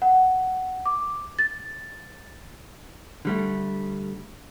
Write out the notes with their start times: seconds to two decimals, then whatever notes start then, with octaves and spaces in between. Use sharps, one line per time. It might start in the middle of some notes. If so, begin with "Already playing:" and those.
0.02 F#5
0.86 D6
1.39 A6
3.25 D3 G3 A3